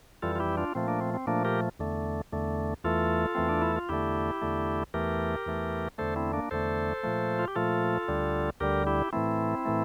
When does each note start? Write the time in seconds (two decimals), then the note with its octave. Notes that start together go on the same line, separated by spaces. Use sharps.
0.22 F2 E3 G3 F4 A4
0.36 F4
0.40 E4 G4
0.57 D4 F4
0.75 A#2 F3 A3 C4
0.88 A#3 D4
1.01 C4
1.14 C4
1.27 A#2 F3 A3 A#3 D4
1.45 G4 A#4
1.79 E2 D3 A3
2.32 E2 D3 A3
2.84 E2 E3 A3 F4 A4
3.35 E2 E3 A3 C4
3.49 D4
3.62 E4
3.76 F4
3.89 E2 D3 A3 E4 G4
4.42 E2 D3 A3
4.94 E2 E3 A3 G4 A#4
5.46 E2 E3 A3
5.98 E2 D3 A3 A4 C5
6.16 C4 E4
6.33 A#3 D4
6.51 E2 D3 A3 A4 C5
7.03 A#2 F3 A3
7.39 F4
7.48 G4
7.55 A#2 F3 A3 F4 A4
8.08 D2 D3 G3
8.60 D2 D3 G3 G4 A#4
8.87 E4 G4
9.13 A2 E3 A3 C4 E4
9.65 A2 E3 A3